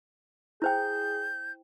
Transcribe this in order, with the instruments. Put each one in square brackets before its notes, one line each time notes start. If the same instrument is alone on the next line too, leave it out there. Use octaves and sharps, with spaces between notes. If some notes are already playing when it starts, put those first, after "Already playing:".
[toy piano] E4 C5 G5 [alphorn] G#4 [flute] G6